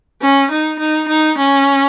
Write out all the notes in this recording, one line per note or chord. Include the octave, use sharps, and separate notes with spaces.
C#4
D#4
D#4
D#4
C#4